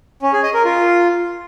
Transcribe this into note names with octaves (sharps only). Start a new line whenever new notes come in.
C#4
G#4
D#5
A#4
F4